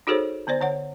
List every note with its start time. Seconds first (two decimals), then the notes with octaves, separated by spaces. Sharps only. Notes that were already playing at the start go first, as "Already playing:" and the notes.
0.07 D#4 F#4 G#4 A4 C5 C#5
0.47 D3 B3 C5 D5
0.60 D3 C#5 F#5